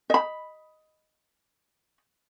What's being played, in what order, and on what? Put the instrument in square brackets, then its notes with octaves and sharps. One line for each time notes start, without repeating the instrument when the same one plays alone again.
[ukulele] D#5 B5